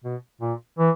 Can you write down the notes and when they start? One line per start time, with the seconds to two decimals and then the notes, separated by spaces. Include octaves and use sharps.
0.04 B2
0.41 A#2
0.79 E3